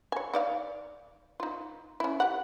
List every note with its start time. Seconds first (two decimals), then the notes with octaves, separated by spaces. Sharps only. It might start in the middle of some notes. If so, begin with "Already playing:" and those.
0.12 C#5 G#5
0.34 D#4 D5 F5
1.40 D#4 F4
2.00 C#4 E4
2.20 G4 F#5